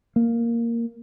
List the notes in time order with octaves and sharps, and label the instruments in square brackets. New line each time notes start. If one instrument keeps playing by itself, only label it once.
[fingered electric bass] A#3